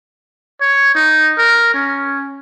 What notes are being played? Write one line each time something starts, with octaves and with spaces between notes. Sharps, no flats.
C#5
D#4
A#4
C#4